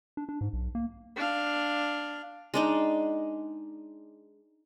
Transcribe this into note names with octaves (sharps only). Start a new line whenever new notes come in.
D4
D4
G#2
B1
A#3
D4 F5
G#3 D4 D#4